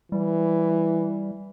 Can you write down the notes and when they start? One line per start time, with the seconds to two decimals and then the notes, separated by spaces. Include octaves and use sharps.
0.12 E3 G3